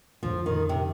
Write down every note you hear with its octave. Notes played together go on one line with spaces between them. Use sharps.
F2 D3 F3 A3
D#3
C3